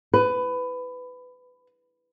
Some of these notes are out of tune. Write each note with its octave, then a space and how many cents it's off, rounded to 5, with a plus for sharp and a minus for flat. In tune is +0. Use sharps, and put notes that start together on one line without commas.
B4 +20